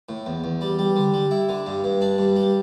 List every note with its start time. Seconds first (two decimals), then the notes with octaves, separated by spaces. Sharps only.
0.09 A2
0.26 E2
0.44 E2
0.61 G3
0.79 G3
0.96 D3
1.14 G3
1.31 E4
1.49 D3
1.66 G2
1.84 G2
2.01 D4
2.18 G2
2.36 G3